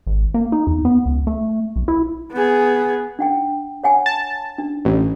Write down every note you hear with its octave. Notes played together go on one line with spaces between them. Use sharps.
G#1
A#3
D#4
E2
B3
C#2
A3
B1
E4
B3 G#4
D4 F#5 G5
C#5 F#5 G#5
A5
D4
A1